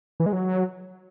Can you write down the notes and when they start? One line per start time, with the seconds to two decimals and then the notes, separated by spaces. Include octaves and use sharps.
0.20 E3
0.26 G#3
0.33 F#3